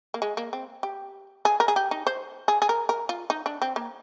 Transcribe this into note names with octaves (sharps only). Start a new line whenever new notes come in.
A#3
G#3
A#3
C4
G4
G#4
A#4
G#4
G4
D#4
C5
G#4
G#4
A#4
A#4
F4
D#4
D4
C4
A#3